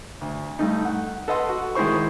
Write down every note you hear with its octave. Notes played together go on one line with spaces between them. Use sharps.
D2
G2 A3 D#4
F#5
A4 B4 D#5 F#5 C6
F#4
D#3 G#3 E4 C5 C#6